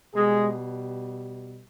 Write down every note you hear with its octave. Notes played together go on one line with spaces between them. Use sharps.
B2 G3 G#3 G#4